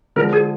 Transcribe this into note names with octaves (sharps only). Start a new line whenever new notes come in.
D3 F3 G#3 A#4
G#4